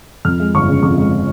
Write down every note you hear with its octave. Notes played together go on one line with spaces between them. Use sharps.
F2 F6
G#3
G1 C#6
C#3
F2 C#6
G#3